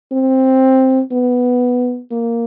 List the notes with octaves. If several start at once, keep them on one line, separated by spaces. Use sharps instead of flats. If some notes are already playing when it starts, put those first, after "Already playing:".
C4
B3
A#3